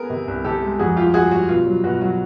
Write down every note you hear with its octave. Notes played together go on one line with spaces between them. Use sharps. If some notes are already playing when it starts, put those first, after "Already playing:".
Already playing: B3 G#4 A#4
C3
C2
C3 G4 A4
G#3
F2 F#4 G#4
G3 F4 G4
G3 F#4 G#4
G3 F#4
B2 F4
F#3
B2 F#4
F#3 F#4